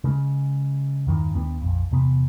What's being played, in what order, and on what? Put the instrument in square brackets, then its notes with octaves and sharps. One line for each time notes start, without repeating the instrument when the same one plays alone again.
[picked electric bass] C#3 G#3
E2 G2 D#3
D#2 B3 C#4 D4
A#1 F2
E2 C3 B3